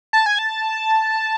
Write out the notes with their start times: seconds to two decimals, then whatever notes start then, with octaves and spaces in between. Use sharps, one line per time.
0.13 A5
0.26 G#5
0.39 A5